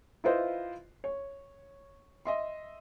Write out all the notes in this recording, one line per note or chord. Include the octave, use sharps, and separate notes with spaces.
E4 F4 B4 C5 D#5
C#5
D#5 E5 C6